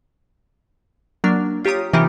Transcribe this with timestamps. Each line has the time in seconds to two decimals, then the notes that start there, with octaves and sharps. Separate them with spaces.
1.24 F#3 A#3 D4 A#4
1.65 F4 G4 C#5 A#5 D#6
1.93 C3 E3 A#3 D#4 F4 G4